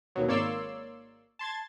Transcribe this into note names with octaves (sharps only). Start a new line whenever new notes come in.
D#2 B2 F#3
G#1 A#3 C#5 D5 C6 E6
A5 C6 G#6 A6